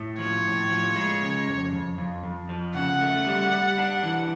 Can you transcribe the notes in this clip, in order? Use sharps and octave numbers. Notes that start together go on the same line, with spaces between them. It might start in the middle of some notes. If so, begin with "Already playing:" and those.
Already playing: A2
F3 C#5
A2
F3
G#3
C#3
F2
F2
F2
F2
F3
C#3 F#5
A3
G3
G3
D4
E3